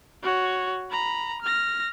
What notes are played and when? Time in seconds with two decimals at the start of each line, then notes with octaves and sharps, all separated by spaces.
0.23 F#4 C#5
0.90 A#5 B5
1.42 F6 A#6